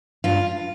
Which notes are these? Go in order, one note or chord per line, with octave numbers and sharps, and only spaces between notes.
G2 F4